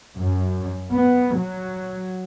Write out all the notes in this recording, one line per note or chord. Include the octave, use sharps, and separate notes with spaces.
F#2
B3
F#3